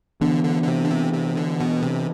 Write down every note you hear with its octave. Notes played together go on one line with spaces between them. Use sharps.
D3 E3 B3 D4
D3
D3
C3
D3
C3
C3
D3
B2
C3